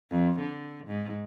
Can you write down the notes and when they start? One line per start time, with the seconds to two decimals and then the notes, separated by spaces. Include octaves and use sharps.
0.10 F2
0.40 D3
0.87 G#2